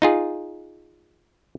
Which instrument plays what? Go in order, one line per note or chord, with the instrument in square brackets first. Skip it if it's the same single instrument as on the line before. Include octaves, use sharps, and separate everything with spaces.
[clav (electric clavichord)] D#4 F4 G#4